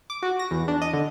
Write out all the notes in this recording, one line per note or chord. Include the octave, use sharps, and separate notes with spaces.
D6
F#4
A#6
E2
D4
D#5
D3